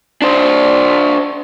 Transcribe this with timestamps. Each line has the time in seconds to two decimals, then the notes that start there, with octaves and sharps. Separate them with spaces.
0.22 D4 C5